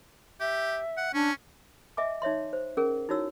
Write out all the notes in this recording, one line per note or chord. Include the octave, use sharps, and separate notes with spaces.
G4 E5
F#5
C#4 D4
D#5 E5 G#5 D6
D#4 C#5 E5 C6
C5
C#4 G#4 A#4
D#4 E4 F#4 C#5 E6